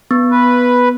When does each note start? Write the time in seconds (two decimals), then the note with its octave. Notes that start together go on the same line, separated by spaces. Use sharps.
0.11 B3
0.31 B4